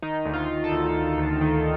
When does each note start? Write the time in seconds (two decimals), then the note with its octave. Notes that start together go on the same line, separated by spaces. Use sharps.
0.02 D#3 D#4
0.26 D2
0.34 F4
0.48 D2
0.64 A4
0.72 D2
0.95 D2
1.18 D2
1.41 D#3